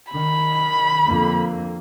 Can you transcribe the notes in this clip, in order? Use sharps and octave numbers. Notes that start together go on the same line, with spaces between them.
D#3 B5
F2 D3 A#3